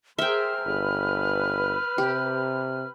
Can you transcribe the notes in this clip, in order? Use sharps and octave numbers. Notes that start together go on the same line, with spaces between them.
G#4 A#4 C5 E5 G5 F6
G1 B4
C3 G4